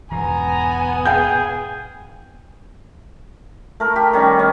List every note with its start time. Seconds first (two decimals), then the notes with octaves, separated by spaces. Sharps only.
0.11 E1 E2 G#2 B3 G#5 A#5
1.06 G#4 F5 G5 G6
3.80 A3 A#4
3.96 G4
4.13 D#3 G3 C#4
4.38 C#4 D#5